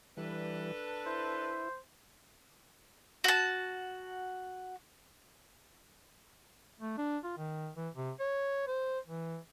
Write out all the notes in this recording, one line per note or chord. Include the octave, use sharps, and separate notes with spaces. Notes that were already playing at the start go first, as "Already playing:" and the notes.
E3 G3 D4 A4 B4
E4 C5
F#4 A5
A3
D4
F4
D#3
E3
C3
C#5
C5
E3